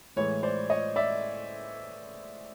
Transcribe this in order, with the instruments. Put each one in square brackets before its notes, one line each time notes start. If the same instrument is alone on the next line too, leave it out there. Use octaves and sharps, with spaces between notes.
[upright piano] A2 E3 G#3 C#5
C5 D5
C#5 D#5
D5 E5